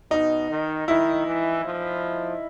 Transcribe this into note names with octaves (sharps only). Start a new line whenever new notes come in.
B2 D#4
D#3
D#3 E4
E3
F3